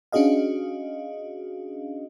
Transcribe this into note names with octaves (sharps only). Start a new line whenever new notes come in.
C#4 D4 F#4 G#4 D#5 F5